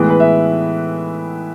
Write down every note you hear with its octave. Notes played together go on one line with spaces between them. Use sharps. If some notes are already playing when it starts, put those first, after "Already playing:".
Already playing: A2 E3 G#3 B3
B4
E5